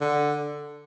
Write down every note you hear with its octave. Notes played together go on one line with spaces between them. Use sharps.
D3